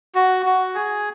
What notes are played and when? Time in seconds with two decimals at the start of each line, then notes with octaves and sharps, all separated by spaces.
0.15 F#4
0.46 F#4
0.75 G#4